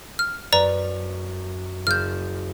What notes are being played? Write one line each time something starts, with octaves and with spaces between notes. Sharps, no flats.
F6
F#2 B4 D5 A#5
F#1 F6 G6 A6 E7